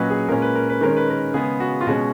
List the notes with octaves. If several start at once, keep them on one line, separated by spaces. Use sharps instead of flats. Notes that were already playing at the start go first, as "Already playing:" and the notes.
Already playing: A#2 F#3 C#4 B4 D#5
G#4
A#2 G#3 C#4 A#4
B4
A#4
B4
D#3 G#3 C#4 A#4
B4
A#4
C#3 G#3 B3 G#4
F#4
F4
B2 G#3 C#4 F#4